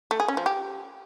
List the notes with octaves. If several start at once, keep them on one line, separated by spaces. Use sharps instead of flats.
A3
G#4
C#4
F3
G4